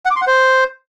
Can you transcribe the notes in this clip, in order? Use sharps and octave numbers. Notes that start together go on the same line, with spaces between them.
F#5
D6
C6
F#5
C5